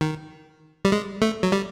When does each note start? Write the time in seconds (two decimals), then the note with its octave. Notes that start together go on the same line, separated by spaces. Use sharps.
0.01 D#3
0.85 G3
0.92 G#3
1.22 A3
1.43 F#3
1.52 G3